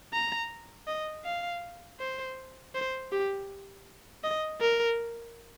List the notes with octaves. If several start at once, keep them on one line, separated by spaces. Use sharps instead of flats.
A#5
D#5
F5
C5
C5
G4
D#5
A#4